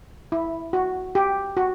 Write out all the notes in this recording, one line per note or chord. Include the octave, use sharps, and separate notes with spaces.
E4
F#4
G4
F#4